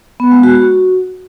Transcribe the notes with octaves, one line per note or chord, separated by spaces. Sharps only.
B3
G#3
F#4
F#4